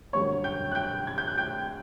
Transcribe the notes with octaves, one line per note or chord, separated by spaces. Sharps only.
F#2 D3 G3 A#3 C#5 C#6
G5 G6
F#6
G5 G6
G#6
G6
F#6
G5 G6